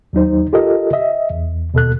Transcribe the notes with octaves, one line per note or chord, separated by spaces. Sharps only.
D#2 F#3 D#4 C5
F4 G4 A4 A#4 D#5
D#5 E5
E2
D#2 B2 A4 F#6